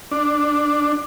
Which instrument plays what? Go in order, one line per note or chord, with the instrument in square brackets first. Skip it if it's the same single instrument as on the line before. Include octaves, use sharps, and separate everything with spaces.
[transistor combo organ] D4